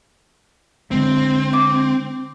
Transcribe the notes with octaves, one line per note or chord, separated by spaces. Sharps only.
D3 G#3 B3 C4
D6